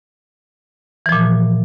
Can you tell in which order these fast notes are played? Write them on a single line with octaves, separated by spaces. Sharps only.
E3 F3 A#2